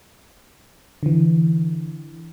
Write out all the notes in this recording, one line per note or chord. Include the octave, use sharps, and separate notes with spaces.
D3 E3